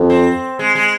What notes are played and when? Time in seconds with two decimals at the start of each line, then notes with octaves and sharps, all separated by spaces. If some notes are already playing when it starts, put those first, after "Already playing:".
Already playing: F2
0.10 C4
0.59 G#3
0.75 G#3